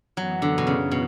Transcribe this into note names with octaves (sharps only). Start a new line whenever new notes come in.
F#2 E3 F#3 B3
D3
B2
C#3
B2